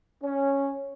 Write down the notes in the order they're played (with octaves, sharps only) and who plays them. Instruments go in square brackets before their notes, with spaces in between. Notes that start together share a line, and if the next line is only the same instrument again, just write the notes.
[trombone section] C#4